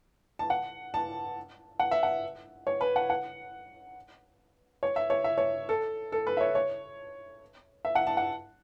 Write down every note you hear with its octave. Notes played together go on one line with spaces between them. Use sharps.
A5
F#5
A5
F#5
E5
F#5
C#5
B4
F#5
F#5
C#5
E5
C#5
E5
C#5
A4
A4
B4
E5
C#5
C#5
E5
F#5
A5
F#5